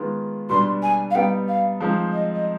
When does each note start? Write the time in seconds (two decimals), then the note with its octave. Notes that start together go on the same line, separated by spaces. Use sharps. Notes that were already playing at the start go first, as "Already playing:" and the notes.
Already playing: D#3 G#3 B3 F4
0.49 B2 G3 D4 C6
0.82 G#5
1.10 F5
1.14 G3 B3 D#4 G5
1.48 F5
1.81 F3 G#3 C4 D#4
2.12 D#5
2.35 D#5